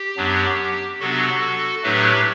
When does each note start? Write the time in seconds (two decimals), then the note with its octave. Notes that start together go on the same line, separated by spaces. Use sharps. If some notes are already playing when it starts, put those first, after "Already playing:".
Already playing: G4
0.17 F#2 F#3 B3 D4
1.00 C3 F#3 B3 D4 F#4 A4
1.83 A2 F#3 A3 D4 G4 B4